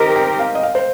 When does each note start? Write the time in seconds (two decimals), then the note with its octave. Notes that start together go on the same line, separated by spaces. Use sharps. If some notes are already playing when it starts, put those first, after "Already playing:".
Already playing: D#3 C4 G4 A#4 D#5
0.16 G5
0.39 F5
0.55 D#5
0.63 F5
0.75 C5